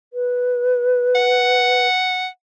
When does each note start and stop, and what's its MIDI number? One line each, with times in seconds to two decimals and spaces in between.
0.13 1.87 71
1.15 2.27 78